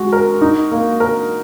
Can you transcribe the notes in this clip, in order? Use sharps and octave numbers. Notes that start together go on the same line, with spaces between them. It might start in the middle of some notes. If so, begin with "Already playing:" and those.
Already playing: G#3 F#4
A#4
D#4
A#3
A#4